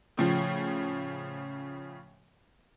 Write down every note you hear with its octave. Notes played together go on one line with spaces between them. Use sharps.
A2 C#3 F3